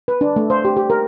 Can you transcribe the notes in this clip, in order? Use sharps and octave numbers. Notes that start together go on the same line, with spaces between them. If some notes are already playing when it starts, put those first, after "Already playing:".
B4
D4
A3
C5
G4
G4
A#4